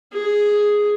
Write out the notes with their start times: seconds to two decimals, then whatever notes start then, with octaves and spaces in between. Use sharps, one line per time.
0.13 G#4